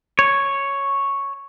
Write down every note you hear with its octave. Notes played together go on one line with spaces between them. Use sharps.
C#5